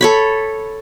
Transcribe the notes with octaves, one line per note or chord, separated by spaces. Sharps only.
A4 C#5 B5